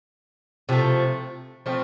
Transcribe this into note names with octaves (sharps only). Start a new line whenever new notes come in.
C3 F3 A3
F3 A3 C4 F4